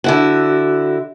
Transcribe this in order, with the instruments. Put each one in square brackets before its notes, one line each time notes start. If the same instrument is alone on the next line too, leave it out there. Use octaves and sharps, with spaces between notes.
[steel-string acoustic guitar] D3 E4 F#4